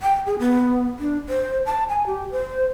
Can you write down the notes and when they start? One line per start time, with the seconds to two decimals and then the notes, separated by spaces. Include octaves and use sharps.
0.02 G5
0.26 G#4
0.39 B3
0.99 D4
1.29 C5
1.66 A5
1.89 G#5
2.07 G4
2.31 C5